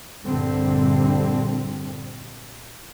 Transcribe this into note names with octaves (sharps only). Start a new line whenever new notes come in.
A#1 G2 A#2 D3 G3 C4